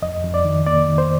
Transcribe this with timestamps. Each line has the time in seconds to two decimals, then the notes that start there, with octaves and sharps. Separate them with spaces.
0.02 F2 D#5
0.23 F2
0.34 D5
0.45 D#3
0.66 A#3 D5
0.88 D#3
0.98 C5